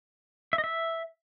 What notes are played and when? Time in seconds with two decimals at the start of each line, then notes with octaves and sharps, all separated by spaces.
0.53 E5
0.58 D#5
0.64 E5